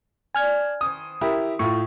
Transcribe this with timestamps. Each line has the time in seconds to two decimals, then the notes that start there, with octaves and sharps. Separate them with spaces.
0.35 D4 G#5 F6 G#6
0.81 D#3 E3 C5 D#6
1.21 E4 G4 A#4
1.59 A2 F4 C#6